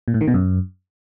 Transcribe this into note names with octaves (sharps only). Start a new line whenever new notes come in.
A#2
A2
D#3
B2
F#2